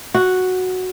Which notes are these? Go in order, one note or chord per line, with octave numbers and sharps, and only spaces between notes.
F#4